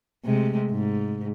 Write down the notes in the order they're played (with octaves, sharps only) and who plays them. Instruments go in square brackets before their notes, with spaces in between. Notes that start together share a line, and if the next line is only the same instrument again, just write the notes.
[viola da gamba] C3 G#3 A3
G#2